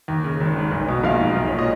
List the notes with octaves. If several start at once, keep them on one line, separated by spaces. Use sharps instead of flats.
D#2
C#3
G#1
G#2
B1
B2
A#1 F5
G#2
B1
A#2 C#5
D#5